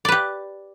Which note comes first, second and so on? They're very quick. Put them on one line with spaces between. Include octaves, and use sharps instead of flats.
D5 B4 G4